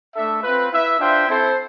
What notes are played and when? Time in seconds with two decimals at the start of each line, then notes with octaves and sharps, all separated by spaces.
0.15 A3 D4 A4 E5
0.43 C4 F4 B4
0.71 E4 B4 E5
0.98 D4 F4 C5 E5 G5
1.27 C4 E4 A4 C5